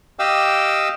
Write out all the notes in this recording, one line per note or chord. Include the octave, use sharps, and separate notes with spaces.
G4 D#5 F5 G5 D6 E6